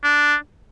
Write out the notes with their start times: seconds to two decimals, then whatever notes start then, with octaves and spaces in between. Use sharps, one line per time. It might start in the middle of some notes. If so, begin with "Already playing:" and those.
0.04 D4